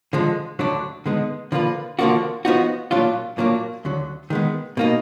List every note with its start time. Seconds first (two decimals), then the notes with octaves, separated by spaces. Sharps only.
0.13 D3 F3 G#3
0.59 D2 D3 F#3 D4
1.06 D3 G#3 B3 D#4
1.52 D3 F3 A#3 F4 B4
1.99 D3 F3 A#3 D4 F#4
2.45 F3 B3 D#4 F#4
2.91 A#2 F#3 D4 F4
3.38 A#2 F#3 A#3 D4
3.85 D2 D3 F#3
4.30 D#3 G#3 B3
4.77 B2 A#3 D#4